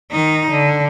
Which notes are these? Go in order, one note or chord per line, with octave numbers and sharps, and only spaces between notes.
D#3 D#4
D3